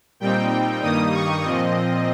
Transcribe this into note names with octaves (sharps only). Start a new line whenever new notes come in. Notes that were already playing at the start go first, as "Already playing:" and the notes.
A#2 G3 C4 D#4 G5
G2 D#3 G3 A#3 D#4 D#6
C#6
A#2 F3 C4 D#5